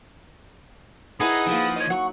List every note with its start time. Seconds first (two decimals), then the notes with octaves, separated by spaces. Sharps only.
1.20 D#4 E4 G#4 A#4 B4 F#5 A5 D#6
1.47 F3 A#3 D#4
1.76 C#5 D#5
1.90 F#3 F#5 C#6